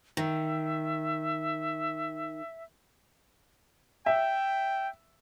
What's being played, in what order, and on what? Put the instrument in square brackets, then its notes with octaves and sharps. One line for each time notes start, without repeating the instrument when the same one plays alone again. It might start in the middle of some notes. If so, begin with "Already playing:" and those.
[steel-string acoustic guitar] D#3 [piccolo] E5
[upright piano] E5 [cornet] G5